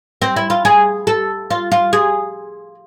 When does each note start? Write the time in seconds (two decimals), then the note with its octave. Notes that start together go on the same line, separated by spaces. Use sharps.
0.22 C4
0.36 E4
0.50 F4
0.65 G#4
1.07 A4
1.51 F4
1.72 F4
1.93 G#4